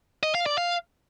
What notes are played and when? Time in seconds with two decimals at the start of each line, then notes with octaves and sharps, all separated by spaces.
0.23 D#5
0.35 F5
0.46 D5
0.58 F5